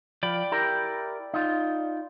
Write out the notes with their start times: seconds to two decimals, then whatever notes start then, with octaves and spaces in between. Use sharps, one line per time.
0.23 F3 D5 G5 B5
0.52 E4 G4 A#4
1.34 D#4 F4